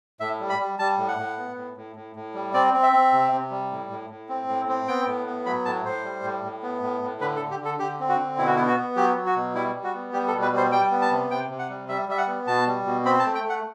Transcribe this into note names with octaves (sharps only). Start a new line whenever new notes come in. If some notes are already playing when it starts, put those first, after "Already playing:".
A2 E5
G3
B5
G3
G3 A5
A2
F#5
A2
B3
A2
A2
A2
A2
G3
C4 D5
C4
E5
C4
C3
C3
G3
A2
A2
A2
C4
A2
C4
B3 G5
A2
B3
F#3 B5
A2 A5
A2 C5
G3
A2
A2
B3
A2
A2
D3 B4
A4
D3
G4
D3 A4
D3 G4
C4
F#4
D3
B2 E4
F#4
B3 E4
F#4
B3
F#3 G4
F#3
F#4
B2
G3 E4
G3
F#4
B3
G3 G4
A4
B2
B4
G3
C5
G3 G5
B3
A5
C3
C3 G5
C3
F#5
G3
G3 E5
G3 E5
F#5
B3
B2 A5
G3
B2
C4 B5
A5
A3
G5
A3
F#5